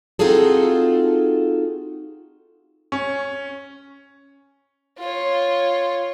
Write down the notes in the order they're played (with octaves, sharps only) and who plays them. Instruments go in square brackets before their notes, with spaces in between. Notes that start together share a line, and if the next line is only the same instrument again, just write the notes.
[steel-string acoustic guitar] C4 D#4 F4 F#4 G#4 A4
[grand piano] C#4
[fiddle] F4 C#5